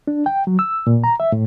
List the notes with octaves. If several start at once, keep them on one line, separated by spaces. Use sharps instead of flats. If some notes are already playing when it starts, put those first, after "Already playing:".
D4
G5
F#3
E6
A#2
A#5
E5
A2